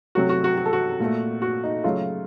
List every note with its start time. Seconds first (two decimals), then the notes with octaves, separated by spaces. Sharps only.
0.15 C3 F#3 A3 F#4
0.29 F#4
0.44 F#4
0.58 F#4
0.66 A4
0.73 F#4
1.00 A#2 A3
1.42 F#4
1.64 D#4
1.84 C#3 F#3 A3 F4